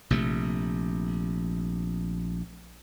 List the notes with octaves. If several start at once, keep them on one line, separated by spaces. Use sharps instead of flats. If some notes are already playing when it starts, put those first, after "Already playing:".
A#1 C3 A3